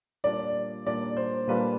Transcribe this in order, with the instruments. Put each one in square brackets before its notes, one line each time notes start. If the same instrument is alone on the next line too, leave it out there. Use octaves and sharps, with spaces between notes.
[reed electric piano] A#2 G3 A#3 D4 F4 [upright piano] D5
[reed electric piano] A#2 G3 A#3 D4 F4 [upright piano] D5
[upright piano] C5
[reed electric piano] A#2 G3 A#3 D4 F4 [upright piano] B4